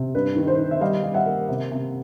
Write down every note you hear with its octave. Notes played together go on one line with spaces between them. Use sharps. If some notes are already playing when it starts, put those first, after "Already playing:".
Already playing: C3
G2 B4
D#3
C5
D#3
E5
G3 D#5 F5
G3
E5 F#5
A#3
C3
C3